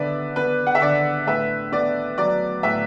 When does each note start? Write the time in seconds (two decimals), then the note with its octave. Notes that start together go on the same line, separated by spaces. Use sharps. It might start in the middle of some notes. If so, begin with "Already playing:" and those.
Already playing: D3 B3 B4 D5 E5
0.36 B3 B4
0.67 F#5
0.75 E5
0.81 D3 D5
1.27 A2 B4 E5
1.72 B3 D5
2.18 F#3 D5
2.63 A2 B4 E5